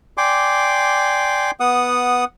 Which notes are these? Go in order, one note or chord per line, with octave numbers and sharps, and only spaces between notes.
D5 G5 G#5 C6 D6
B3 F#5 D#6